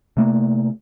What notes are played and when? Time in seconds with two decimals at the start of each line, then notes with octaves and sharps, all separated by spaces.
0.17 C3 A3 A#3